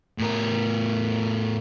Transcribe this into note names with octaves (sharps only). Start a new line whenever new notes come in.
A2 A#4